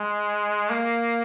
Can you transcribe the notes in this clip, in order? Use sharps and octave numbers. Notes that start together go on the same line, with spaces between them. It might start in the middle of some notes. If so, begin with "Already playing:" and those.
Already playing: G#3
A#3